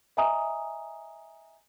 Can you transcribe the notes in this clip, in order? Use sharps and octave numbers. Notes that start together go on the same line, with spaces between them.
D#5 E5 G#5 A#5 D#6